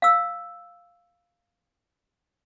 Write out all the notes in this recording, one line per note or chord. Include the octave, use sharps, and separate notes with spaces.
F5 E6